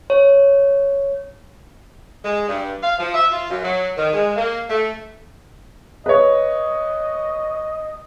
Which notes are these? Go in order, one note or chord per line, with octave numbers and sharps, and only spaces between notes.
C#5
G#3
G2
F5
F3
E5
F4
F#2
F#3
D#3
G#3
A#3
A3
B4 C#5 D#5